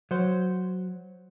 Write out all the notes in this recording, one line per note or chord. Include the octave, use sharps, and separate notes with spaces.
F#3 C5